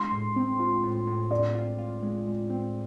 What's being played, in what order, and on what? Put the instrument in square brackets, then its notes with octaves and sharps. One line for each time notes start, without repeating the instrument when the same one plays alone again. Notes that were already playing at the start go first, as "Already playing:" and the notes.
Already playing: [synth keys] G#3 [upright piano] C6
[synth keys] A2
C4
F4
A2
A2
[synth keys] A2 [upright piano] D5
[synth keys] F4
F4
G#3
G#3
C4